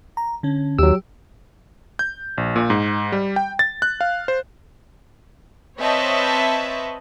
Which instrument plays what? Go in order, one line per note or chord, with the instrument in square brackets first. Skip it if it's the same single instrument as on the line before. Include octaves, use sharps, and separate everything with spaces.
[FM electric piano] A#5
D3 C#4
[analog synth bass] D#2 [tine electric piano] F#3 E6 [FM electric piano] G4
[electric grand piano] G6
A#1
A#2
G#2
G3
G5
A6
F#6
F5
C5
[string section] C4 B4 C#5 D#5 E5 A5